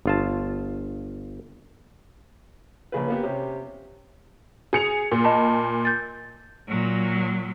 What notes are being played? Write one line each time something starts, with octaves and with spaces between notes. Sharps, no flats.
G1 F4 A5
A#1 C#3 B4
A#3 B3 G4
C3 C#4 G4
G#4 C#7 F7
A#2
D#5 A5 B5
G6 A6
A#2 F#3